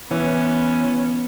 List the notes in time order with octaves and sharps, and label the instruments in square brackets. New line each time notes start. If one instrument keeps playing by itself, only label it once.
[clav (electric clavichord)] E3 [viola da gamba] B3 [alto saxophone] C#4